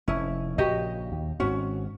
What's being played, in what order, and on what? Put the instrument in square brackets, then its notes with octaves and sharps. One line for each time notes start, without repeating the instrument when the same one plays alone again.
[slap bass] F1 [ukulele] C#4 E4
[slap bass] A#1 A#2 C#3 [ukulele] F#4 G4 D#5
[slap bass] D#2
[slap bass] G#1 G#2 C4 [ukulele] C#4 F#4